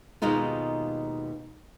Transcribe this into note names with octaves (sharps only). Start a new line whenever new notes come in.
D#2 B2 G#3 D#4 F4